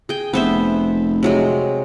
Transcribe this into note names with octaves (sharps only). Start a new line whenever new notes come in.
G#4 G5
F1 B3 C5 E5
C3 F#3 G#3